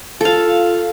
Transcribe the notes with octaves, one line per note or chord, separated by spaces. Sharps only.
F4 A4 F5